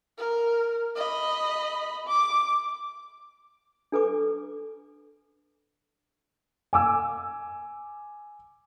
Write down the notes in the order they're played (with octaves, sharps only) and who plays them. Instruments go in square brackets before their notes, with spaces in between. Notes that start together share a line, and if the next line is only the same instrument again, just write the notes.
[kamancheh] A#4
D#5 B5
D6
[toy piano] D4 A4 B4 D6
[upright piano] G#5 D6 E6